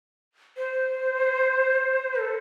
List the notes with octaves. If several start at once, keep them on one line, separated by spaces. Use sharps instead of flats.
C5
A4